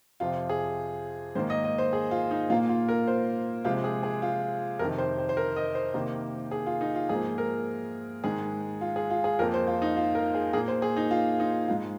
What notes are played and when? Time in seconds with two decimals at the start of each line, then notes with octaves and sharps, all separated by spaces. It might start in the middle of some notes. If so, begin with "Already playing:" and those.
0.20 F2 C3 F3 F4
0.49 G#4
1.35 G#2 D#3 A#3 C5
1.50 D#5
1.64 D#5
1.78 C5
1.93 G#4
2.11 F4
2.31 D#4
2.50 A#2 A#3 F4
2.69 F4
2.89 A#4
3.08 C5
3.65 C3 F3 G#3 F4
3.84 G#4
4.03 G#4
4.22 F4
4.79 F2 C3 D#3 A#4
4.98 C5
5.18 C5
5.29 C5
5.37 A#4
5.56 D#5
5.75 C5
5.94 C3 D#3 A#3
6.51 G#4
6.66 F4
6.81 D#4
6.95 F4
7.09 G#2 F3 A#3 G#4
7.38 A#4
8.24 G#2 D#3 G#3 G#4
8.81 F4
8.96 G#4
9.10 F4
9.24 G#4
9.39 F2 F3 A#3 A#4
9.54 C5
9.67 F4
9.82 D#4
9.97 F4
10.15 A#4
10.35 G#4
10.53 A#2 A#3 G#4
10.68 C5
10.82 G#4
10.96 D#4
11.11 F4
11.40 D#4
11.68 G#2 G#3 F4